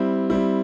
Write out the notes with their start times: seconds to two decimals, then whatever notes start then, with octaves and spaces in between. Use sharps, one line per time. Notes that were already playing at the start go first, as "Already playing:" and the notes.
Already playing: G3 C4 E4
0.30 G3 C4 E4